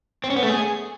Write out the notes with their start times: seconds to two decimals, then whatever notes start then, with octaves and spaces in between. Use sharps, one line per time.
0.24 C4
0.30 C#4
0.36 B3
0.43 A3
0.49 G#4